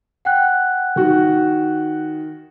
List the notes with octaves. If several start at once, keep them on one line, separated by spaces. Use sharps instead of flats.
F#5 G5 F#6
D#3 F#4